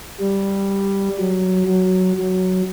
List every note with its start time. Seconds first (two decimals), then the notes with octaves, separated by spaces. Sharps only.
0.20 G3
1.19 F#3
1.68 F#3
2.18 F#3